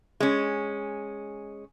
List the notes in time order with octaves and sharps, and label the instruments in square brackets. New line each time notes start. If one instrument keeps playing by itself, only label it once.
[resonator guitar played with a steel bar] G#3 C#4